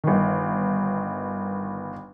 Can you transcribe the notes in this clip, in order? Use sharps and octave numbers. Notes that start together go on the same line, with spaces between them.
G1 D#3